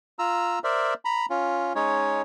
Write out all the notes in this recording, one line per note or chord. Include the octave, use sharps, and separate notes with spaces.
F4 A#5 E6
A#4 C5 D5 E5
A#5 B5
C#4 F4
G#3 C#4 D#4 C#5